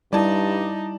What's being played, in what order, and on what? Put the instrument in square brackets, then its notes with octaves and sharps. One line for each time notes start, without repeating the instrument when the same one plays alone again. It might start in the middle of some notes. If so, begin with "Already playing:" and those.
[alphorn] G2 [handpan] G3 E4 [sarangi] D#4 [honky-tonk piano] D5 A5